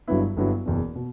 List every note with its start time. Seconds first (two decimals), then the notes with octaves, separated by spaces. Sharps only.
0.08 G1 G2 F#3 B3 E4
0.37 G1 G2 F#3 B3 E4
0.66 F#1 E2 B2
0.95 B2